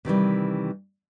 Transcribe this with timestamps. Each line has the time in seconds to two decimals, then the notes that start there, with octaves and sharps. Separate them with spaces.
0.05 C3 D#3 E3 G3